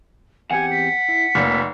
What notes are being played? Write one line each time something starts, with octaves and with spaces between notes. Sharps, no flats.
E2 C4 G4 F#5 G#5
B6
E4
F1 F2 A#3